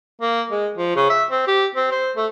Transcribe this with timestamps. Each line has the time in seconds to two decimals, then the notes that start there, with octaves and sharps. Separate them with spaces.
0.22 A#3
0.51 G#3
0.78 F3
0.96 C#3
1.10 E5
1.31 C4
1.47 G4
1.76 C4
1.91 C5
2.17 A3